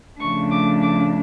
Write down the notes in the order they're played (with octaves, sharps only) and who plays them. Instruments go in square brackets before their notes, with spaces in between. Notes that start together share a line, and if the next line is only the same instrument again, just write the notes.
[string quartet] C#3 F3 A3 D4 C#6
D6
D6